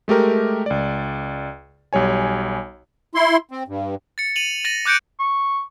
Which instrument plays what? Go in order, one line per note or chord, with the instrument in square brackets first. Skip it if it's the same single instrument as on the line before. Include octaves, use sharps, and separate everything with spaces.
[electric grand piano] G#3 A3 G4 A#4
C#2 D5
B1 G3 C#5 G#5
[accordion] E4 C6
C4
G2
[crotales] A6 C#7
D#7 F7 F#7
A6 A#6 D#7 F#7
D6 F#6 G6 C#7 D7
[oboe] C#6